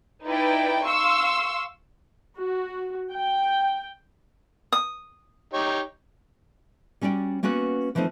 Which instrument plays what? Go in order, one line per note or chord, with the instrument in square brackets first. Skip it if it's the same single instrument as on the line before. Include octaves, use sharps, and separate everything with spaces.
[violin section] D#4 E4 B4 D5 G5
F5 C6 C#6 E6
[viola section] F#4
G5
[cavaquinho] D#6
[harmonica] D#4 G4 C#5
[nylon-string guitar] G3 C#4 F#4 D5 G5
A#3 B3 C#4 F#4 B4
E3 F3 A3 C4 D#4